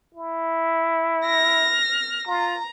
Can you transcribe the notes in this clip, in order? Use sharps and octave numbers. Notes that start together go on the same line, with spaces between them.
E4
F6 A#6
F4 A#5